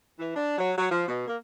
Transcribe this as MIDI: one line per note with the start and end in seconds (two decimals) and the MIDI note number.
0.19 0.31 52
0.36 0.56 62
0.58 0.73 54
0.77 0.87 54
0.90 1.07 53
1.08 1.27 47
1.28 1.37 58